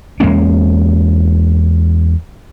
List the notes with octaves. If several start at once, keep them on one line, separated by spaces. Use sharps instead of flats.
E2 G#3 A#3 C#4